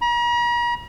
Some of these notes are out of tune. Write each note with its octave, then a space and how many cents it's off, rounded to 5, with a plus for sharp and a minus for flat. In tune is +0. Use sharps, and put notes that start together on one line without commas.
A#5 +45